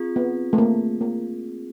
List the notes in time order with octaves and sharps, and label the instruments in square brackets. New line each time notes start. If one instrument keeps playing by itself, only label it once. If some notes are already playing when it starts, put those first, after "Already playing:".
Already playing: [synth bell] C4 F4 G#4
[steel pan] B3
A3
A#3
A#3